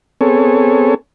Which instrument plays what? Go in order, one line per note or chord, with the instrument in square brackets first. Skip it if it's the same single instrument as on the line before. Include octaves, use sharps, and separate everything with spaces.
[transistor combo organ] B3 C4 G#4 A4 C#5